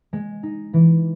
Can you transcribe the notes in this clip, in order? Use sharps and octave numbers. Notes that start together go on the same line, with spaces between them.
G#3
D#4
E3